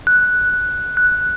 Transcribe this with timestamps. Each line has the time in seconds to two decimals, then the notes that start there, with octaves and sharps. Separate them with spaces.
0.07 F#6